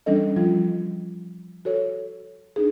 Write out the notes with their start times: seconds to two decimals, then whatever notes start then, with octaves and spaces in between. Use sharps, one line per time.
0.06 E3 G3 C#4 D4 A4 D#5
0.36 F3 G3 F4
1.65 F#4 A4 C#5
2.56 D4 D#4 G#4